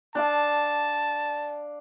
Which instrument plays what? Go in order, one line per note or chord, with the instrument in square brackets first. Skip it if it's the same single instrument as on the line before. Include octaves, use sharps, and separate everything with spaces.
[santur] D4 D5 F5 [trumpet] A5